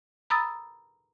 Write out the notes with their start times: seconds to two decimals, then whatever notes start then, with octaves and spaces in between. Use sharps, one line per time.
0.30 A#5 B5 D#6 E6 A6